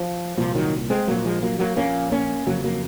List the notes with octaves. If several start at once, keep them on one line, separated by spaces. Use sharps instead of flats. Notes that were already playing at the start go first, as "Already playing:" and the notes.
Already playing: F3
C2 A#2 F3
D#3 F#3
G#3 C4
A#1 A#2 F#3 A#3
F3 G#3
F#3 A#3
F#3 A#3
A#1 A#2 A#3 C#4
A#3 C#4
F#1 F2 C#3 F#3 A#3
F#3 A#3